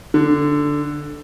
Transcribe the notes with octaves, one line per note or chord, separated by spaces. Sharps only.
D3